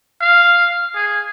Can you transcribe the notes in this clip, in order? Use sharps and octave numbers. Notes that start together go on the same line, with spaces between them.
F5
G#4